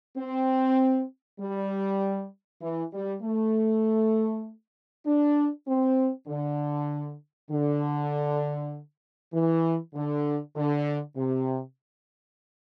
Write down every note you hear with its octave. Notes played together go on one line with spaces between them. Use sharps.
C4
G3
E3
G3
A3
D4
C4
D3
D3
E3
D3
D3
C3